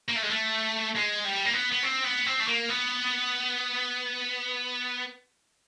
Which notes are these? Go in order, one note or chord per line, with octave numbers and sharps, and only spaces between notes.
A#3
A3
G#3
A3
G#3
G3
A#3
B3
B3
C4
B3
C4
A3
A#3
B3